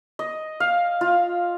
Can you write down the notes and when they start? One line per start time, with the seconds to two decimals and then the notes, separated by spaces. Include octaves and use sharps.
0.19 D#5
0.60 F5
1.01 F4